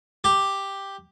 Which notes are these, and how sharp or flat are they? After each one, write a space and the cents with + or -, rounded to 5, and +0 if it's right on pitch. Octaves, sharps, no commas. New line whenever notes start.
G4 +5